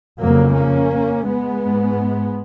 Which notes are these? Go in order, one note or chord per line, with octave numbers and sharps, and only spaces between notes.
F2 C#3 F#3 A#3
A#3 C#4
G#3 B3
G#2